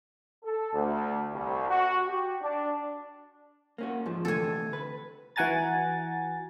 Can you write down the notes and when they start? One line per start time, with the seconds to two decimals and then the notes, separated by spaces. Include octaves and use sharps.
0.43 A4
0.73 D2
1.33 C2
1.69 F#4
2.06 G4
2.41 D4
3.78 A#3 C#4 F#4
4.06 G#2 F3
4.25 D2 C3 E3 A4 G#5
4.73 B4
5.36 E3 F#4 F#5 G#5 A#5 A6